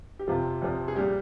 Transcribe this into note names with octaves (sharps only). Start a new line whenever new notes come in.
G4
F2 C3 F3 F4
F2 C3 F3
G#4
A#2 G3 G4